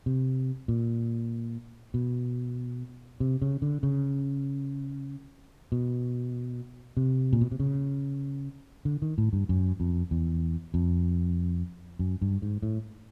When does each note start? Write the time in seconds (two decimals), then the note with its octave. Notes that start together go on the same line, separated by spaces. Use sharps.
0.06 C3
0.68 A#2
1.94 B2
3.20 C3
3.42 C#3
3.62 D3
3.83 C#3
5.72 B2
6.97 C3
7.33 A#2
7.41 B2
7.52 C3
7.60 C#3
8.85 D3
9.02 D#3
9.18 A2
9.33 G2
9.49 F#2
9.80 F2
10.11 E2
10.74 F2
11.99 F#2
12.22 G2
12.42 G#2
12.63 A2